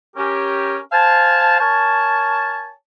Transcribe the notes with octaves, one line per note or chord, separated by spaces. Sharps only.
C#4 G4 A#4
C5 F5 G#5 A5
A#4 C#5 G#5 A5